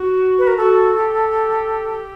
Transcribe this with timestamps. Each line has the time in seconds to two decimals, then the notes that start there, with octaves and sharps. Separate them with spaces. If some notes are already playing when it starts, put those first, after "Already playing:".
Already playing: F#4
0.38 B4
0.47 A#4
0.57 F#4 A4
0.96 G4